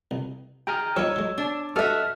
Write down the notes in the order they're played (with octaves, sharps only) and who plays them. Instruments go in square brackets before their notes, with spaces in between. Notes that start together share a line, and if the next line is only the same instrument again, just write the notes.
[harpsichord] C2
[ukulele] G#4 [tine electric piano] G5 A#5 F6
[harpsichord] F3 G3 D#4 [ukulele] C#5 [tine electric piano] E6
[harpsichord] F#3 G#3
[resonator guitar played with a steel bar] D4
[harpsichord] G2 [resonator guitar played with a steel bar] F#4 D#5 [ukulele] A4 E5 [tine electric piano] F6